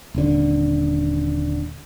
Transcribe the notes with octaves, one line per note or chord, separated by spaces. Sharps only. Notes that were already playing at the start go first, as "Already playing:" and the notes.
D#1 D3